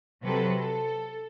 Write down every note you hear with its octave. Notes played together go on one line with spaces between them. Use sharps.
C3 F#3 A4 B4
A4